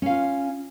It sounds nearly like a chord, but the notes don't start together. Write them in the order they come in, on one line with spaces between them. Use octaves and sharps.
C#4 F5 F4